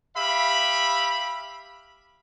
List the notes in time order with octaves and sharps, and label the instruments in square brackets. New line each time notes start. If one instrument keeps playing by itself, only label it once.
[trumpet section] G4 E5 F5 B5